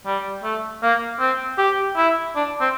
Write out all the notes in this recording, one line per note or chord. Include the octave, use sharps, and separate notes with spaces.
G3
A3
A#3
C4
G4
E4
D4
C4